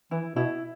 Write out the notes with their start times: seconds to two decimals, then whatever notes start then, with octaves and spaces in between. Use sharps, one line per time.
0.11 E3 E4
0.36 B2 E4